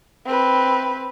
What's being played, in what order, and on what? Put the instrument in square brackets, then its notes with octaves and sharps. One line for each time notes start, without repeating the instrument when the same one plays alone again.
[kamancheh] C4 B4